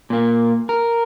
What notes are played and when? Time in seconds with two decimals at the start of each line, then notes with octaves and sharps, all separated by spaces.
0.10 A#2 A#3
0.69 A#4